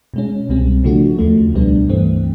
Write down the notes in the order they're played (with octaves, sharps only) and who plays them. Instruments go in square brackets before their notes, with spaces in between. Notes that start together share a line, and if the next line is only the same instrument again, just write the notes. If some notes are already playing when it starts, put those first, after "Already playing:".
[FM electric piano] B2 G#3 C#4
C2 B2 G3 C4
C#3 F3 A3 D4 F#4
D#2 C#3 F3 A3
C#2 B2 G3 B3 D4
G2 E3 A3 C4